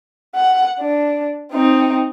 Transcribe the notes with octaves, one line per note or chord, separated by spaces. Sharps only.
F#5
D4
C4 D#4